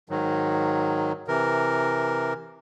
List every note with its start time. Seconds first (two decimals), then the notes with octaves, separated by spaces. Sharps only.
0.10 G#2 D#3 F#3
1.28 C3 E3 A#4